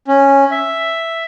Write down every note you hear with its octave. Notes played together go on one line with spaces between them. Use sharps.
C#4
E5